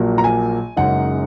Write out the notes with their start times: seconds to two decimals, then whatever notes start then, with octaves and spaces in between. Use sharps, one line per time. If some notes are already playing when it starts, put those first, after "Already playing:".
Already playing: A#1 A#2 F#3 A#3
0.18 A#5
0.24 G#5
0.76 F#1 F#2 C#3 G#3 D#4 F#5